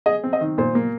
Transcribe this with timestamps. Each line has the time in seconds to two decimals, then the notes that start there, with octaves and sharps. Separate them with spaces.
0.06 G#4 D#5
0.24 C4
0.33 D#5
0.41 D#3
0.58 A#2 C5
0.75 A#3